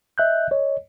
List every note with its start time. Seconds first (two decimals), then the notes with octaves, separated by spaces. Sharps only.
0.18 D#5 E5 F#6 G6
0.51 C#5 D#5